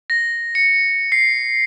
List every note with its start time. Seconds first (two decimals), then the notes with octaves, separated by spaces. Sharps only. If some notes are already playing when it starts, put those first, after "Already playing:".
0.10 A#6
0.55 C#7
1.12 C7